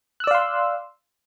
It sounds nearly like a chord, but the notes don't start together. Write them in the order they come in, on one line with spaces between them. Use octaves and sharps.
F#6 E6 D5 F5 C6